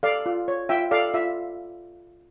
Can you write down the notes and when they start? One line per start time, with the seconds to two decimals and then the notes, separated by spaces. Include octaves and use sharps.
0.03 A4 D5 F5
0.26 F4
0.48 C#5
0.69 F4 E5 G5
0.91 A4 D5 F5
1.14 F4 E5